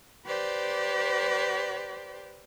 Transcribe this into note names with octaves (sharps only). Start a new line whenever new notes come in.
G4 B4 C5 D5